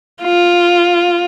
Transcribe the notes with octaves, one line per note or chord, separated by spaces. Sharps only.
F4